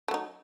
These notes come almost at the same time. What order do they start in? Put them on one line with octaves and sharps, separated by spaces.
A3 F#3 D#4